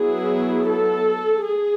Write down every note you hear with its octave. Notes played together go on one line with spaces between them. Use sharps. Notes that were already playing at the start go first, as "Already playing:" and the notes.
Already playing: F#3 B3 E4 G#4
A4
G#4